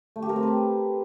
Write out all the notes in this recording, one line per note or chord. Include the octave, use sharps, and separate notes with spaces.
A3
G4
A#4
C4
B4